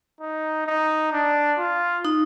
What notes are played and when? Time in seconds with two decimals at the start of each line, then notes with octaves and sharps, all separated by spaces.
0.21 D#4
0.67 D#4
1.12 D4
1.59 F4
2.05 D#4